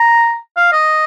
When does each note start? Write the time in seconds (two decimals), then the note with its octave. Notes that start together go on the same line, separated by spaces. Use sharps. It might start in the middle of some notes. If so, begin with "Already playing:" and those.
Already playing: A#5
0.57 F5
0.72 D#5